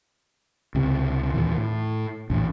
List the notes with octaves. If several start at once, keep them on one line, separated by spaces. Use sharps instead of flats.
C#2 C3
D#2 A#2 E3
A2
A#1 E2 A2 E3